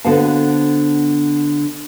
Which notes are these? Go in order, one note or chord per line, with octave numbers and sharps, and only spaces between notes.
D3 B3 F#4 C5 F5 A5